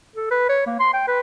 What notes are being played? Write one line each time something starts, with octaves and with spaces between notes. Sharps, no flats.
A4
B4
C#5
A#3
C6
G5
B4